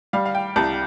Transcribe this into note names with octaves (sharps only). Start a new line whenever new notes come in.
G3 F5
F5
G5
C2 A5